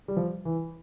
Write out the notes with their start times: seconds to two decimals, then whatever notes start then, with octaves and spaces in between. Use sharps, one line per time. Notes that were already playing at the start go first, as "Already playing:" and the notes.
0.08 G3
0.17 F3
0.45 E3